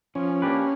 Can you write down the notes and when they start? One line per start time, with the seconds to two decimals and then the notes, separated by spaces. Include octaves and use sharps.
0.15 F3 C#4
0.42 A#3 D4 G4 B4